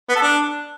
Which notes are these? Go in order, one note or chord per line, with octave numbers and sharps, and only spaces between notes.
B3
A4
D4